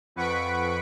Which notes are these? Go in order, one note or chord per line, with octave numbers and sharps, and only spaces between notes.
F2 B4 F#5 C#6 B6 D7